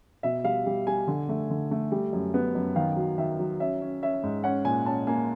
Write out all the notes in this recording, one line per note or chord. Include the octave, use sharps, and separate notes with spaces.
B2 E5
G3 F5
G3
G3 G#5
D3
A3
D3
A3
G3
F#2
B3
F#2
D#3 F5
F#3
D#3 E5
F#3
C#4 E5
C#4
C#4 E5
G#2
C#4 F#5
A#2 G#5
C#4 A5
A#3 G#5